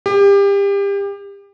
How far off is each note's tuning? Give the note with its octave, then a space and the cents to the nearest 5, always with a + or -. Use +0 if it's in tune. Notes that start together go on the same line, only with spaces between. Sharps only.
G4 +30